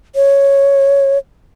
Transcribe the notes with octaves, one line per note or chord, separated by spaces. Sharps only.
C#5